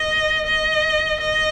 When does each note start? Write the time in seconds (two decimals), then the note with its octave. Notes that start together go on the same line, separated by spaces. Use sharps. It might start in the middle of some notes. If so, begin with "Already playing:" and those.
Already playing: D#5
0.47 D#5
1.21 D#5